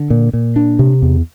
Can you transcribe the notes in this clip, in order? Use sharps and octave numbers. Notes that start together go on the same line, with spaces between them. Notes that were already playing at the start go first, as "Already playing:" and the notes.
Already playing: D3
A#2
A#2
D4
C3
E2